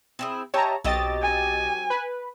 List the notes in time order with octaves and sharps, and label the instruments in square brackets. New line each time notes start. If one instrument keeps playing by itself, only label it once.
[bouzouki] C4 E4 G#4
[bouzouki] G4 D#5 E5 [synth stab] C#5 A5 A#5
[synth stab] B1 D#5 A6 [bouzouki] F#3 C4 G4
[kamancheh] G#5
[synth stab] B4